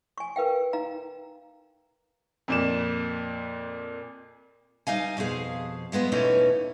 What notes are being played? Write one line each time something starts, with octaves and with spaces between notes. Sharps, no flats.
G#5 C#6
A#4 B4 F5 G5
D#4 F5 A#5
F2 A#2 E7
G3 D#4 F5 G#5
F2 B2 F3 G#4 F5
G3 G#3 B3 F4
E2 B2 E3 A3 C#4 D#4